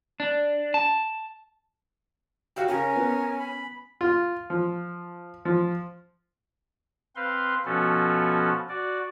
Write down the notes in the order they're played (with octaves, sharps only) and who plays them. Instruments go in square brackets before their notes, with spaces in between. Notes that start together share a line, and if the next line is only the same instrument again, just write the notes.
[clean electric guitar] D4
A5
[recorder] F#4 [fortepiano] G4 F5
[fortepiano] C#3 [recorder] C#4 [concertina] A#4 [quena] G#5
[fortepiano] B3
[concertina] B5
[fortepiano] F4
F3
F3
[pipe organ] C4 B4 F5 C6
B2 F3 B3 C#4 F#4 A4
F#4 D5